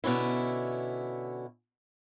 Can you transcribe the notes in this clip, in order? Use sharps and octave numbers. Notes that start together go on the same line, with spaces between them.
B2 D3 C#4 E4